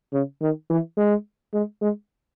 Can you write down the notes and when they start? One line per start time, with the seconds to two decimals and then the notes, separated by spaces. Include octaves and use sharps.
0.13 C#3
0.41 D#3
0.70 E3
0.97 G#3
1.54 G#3
1.81 G#3